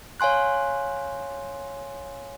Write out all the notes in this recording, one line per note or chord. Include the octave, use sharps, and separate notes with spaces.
C#5 F5 G#5 C6 F#6